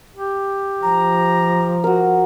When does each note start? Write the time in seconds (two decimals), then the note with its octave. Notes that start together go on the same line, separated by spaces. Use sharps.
0.14 G4
0.83 F3 A#5
1.84 F#4 A#4